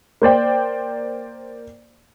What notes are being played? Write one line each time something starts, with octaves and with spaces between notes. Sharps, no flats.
A#3 C5 D5 G5